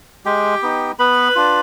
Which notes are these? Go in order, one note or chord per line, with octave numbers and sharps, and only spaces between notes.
G#3 G4 G5
B3 D#4
B3 B4 B5
D4 F4